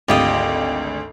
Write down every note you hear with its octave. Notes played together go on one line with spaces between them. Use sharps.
G#1 D2 F4 G4 D#5